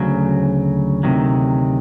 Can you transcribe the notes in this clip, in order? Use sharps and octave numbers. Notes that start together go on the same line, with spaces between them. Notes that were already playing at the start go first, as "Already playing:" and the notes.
Already playing: D2 C#3 F#3
D2 C3 D#3 F#3